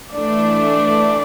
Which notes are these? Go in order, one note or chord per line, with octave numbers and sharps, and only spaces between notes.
E3 A3 D4 D5